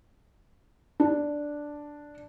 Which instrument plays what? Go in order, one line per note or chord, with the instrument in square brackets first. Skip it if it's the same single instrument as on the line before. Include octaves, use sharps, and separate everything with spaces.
[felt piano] D4